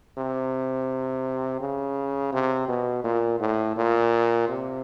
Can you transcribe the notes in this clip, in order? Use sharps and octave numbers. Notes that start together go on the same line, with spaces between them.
C3
C#3
C3
B2
A#2
A2
A#2
C3